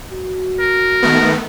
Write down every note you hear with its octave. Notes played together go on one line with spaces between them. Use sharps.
F#4
A#4
D#3 A3 B3